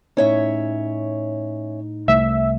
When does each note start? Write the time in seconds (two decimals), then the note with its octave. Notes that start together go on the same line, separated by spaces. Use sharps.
0.17 A2 C#4 D#4 C#5 E5
2.08 C2 A3 E5